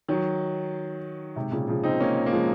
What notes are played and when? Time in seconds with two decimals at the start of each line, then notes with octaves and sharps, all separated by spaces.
0.08 D#3 F#3
1.36 G#2 C3
1.52 A#2 C#3
1.68 C#3 F3
1.84 C4 D#4
2.00 A#3 C#4
2.26 A#3
2.31 F3 G#3